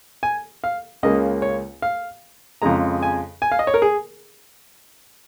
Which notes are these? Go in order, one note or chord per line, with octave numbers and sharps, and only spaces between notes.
G#5
F5
C#2 C#3 A#3 D#5
C#5
F5
F2 C#3 G#3 A#5
G#5
G#5
F5
D#5
C#5
A#4
G#4